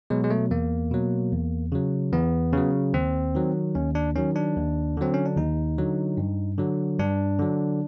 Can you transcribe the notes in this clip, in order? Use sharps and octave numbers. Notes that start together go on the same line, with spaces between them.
B2 F#3 G#3
G#3
A3
E2 A#3
B2 F#3
E2
C#3 F#3
E2 B3
C#3 F#3
D#2 C4
D#3 F#3
D#2 C#4
D4
D#3 F#3 C#4
D4
D#2
D3 F#3 C4
C#4
D4
D#2 D#4
D3 F#3
G2
D3 F#3
G2 D4
D3 F#3